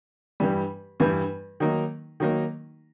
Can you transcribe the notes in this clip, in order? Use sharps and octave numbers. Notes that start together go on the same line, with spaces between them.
G2 E3 G3
G2 E3 G3
D#3 F#3 A#3 D#4
D#3 F#3 A#3 D#4